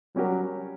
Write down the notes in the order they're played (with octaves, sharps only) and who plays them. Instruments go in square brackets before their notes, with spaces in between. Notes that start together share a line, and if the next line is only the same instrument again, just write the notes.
[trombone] F#3 [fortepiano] G3 C#4 G4 A#4